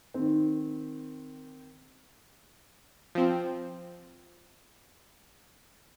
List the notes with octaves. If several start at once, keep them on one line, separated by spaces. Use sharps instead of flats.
D#3 C4
F3 C4